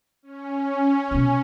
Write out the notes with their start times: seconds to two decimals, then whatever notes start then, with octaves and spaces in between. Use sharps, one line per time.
0.23 C#4
1.11 B2 B3